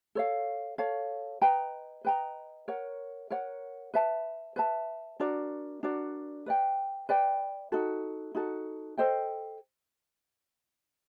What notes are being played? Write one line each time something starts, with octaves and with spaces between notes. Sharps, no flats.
A4 C#5 F5
A4 C#5 F5
B4 D#5 G5 A#5
B4 D#5 G5 A#5
A#4 C#5 F#5
A#4 C#5 F#5
B4 E5 A5
B4 E5 A5
D4 F#4 A#4 D5
D4 F#4 A#4 D5
B4 D5 G5
B4 D5 G5
D#4 F#4 A4
D#4 F#4 A4
A4 C5 D#5 G5